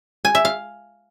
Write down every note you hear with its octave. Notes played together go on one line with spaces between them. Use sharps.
G#5
E5
F5